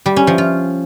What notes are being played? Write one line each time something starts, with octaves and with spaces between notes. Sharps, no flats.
G3
C#4
F3
F4